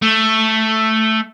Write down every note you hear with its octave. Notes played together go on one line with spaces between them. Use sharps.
A3